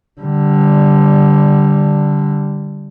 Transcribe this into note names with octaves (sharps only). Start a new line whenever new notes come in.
D3 G3